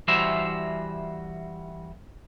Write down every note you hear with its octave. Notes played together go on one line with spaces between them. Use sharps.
E3 G3 F#4 C5 E5